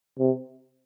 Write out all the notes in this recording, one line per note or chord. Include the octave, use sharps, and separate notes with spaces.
C3